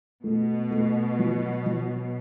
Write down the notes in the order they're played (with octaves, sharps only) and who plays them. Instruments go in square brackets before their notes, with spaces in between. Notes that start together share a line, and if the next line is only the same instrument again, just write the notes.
[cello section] B2 [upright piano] A3
[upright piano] A3
F#3
F#3